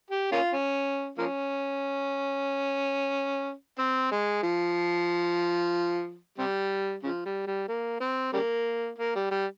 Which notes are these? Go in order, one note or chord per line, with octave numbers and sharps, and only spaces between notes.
G4
A#3 C#4 F4
C#4
F3 A#3 C#4
C4
G#3
F3
C3 G3
C#3 F3
G3
G3
A#3
C4
C#3 G3 A#3
A#3
G3
G3